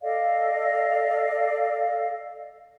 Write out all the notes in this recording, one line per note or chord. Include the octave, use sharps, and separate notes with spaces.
A4 D5 D#5 F5